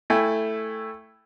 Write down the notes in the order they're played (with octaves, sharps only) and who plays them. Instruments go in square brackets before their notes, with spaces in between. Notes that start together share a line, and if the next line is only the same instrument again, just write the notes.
[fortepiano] A3 E4 G5 G#5